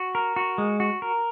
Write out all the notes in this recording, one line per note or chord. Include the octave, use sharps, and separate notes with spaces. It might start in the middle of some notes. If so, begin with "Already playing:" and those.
Already playing: F#4
A#4
F#4
G#3
F#4
A#4